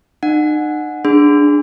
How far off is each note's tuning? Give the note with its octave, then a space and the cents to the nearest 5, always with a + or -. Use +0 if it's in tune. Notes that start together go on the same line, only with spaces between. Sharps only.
D#4 -45 F#5 -10
D4 +0 G#4 +0 C6 -45